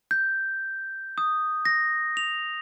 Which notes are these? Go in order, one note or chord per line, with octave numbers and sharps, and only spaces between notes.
G6
D#6
A#6
F7